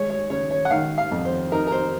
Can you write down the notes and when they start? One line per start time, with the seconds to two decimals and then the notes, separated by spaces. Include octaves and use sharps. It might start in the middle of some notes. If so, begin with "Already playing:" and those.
Already playing: G#3 C#5
0.10 C#5
0.30 C#3 C#5
0.51 C#5
0.65 F#5
0.71 D#3 F5
0.98 F5
1.12 F2
1.25 C5
1.52 D#4 A#4
1.67 A#4
1.72 C5